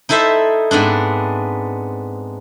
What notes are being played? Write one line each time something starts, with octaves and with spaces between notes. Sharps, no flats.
D#4 E4 A4 C5 E5
G#2 B3 C4 D4